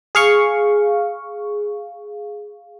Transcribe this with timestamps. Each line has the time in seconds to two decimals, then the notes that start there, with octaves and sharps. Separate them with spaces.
0.15 G#4 F5 C#6